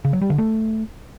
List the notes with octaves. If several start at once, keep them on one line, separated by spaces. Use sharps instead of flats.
C#3
F#3
G3
D3
A3